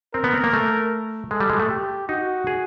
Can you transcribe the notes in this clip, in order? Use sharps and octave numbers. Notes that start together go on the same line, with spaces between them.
C4 A#4
B3
C4
A#3
A3
G#3 A4
G3
G#3
A3
G4
D#4 F#4
G#4